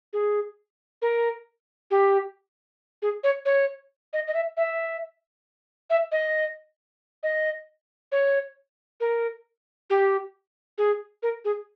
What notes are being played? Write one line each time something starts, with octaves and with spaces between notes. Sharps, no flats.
G#4
A#4
G4
G#4
C#5
C#5
D#5
D#5
E5
E5
E5
D#5
D#5
C#5
A#4
G4
G#4
A#4
G#4